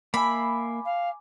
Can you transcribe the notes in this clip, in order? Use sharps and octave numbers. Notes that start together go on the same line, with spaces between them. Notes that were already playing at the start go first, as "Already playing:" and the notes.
A#3 E5 G#5 B5 D6
F5